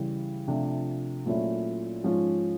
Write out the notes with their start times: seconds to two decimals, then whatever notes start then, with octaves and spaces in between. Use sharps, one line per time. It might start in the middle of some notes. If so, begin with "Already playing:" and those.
Already playing: C#3 E3 G3
0.48 C3 F3 A3 D4 F4
1.26 A#2 F#3 A3 C#4 E4
2.04 G#2 F3 G#3 C#4 F4